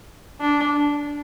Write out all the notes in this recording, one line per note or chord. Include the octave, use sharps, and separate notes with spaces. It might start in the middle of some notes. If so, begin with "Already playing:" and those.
D4